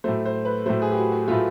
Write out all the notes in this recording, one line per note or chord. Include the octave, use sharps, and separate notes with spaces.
A2 F#3 A3 C5
C5
B4
A2 F#3 A3 C5
G#4
G4
F#4
F#4
A2 F#3 A3 F4